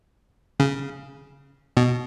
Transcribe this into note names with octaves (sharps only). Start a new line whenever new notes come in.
C#3
B2